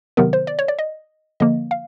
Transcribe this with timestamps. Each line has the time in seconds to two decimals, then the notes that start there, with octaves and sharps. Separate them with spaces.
0.17 C3 D#3 F#3 B3 A#4
0.33 C5
0.47 D5
0.59 C#5
0.68 D5
0.79 D#5
1.40 D3 F3 A#3 D#5
1.71 F5